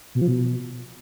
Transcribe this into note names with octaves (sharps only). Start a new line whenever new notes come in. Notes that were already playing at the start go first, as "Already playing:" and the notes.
B2
F3
B2